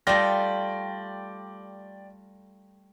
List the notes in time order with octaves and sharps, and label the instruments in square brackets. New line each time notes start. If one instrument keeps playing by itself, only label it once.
[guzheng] G3 A3 F4 [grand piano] D5 G5 A#6